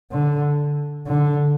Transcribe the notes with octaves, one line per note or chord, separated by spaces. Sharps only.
D3
D3